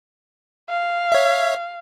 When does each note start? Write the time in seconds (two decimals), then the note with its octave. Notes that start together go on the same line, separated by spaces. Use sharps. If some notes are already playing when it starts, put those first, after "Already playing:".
0.69 F5
1.12 C#5 E5